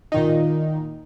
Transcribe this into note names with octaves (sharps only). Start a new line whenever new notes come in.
A#2 D#3 D#4